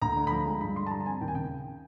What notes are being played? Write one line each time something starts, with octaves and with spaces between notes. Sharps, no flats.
D2 A#5
D3
B5
F3 A#5
G#3
G2 B5
D3 C6
A5
G3 A#5
A5
C4 G#5
D#2 G5
G#5
C#3 G5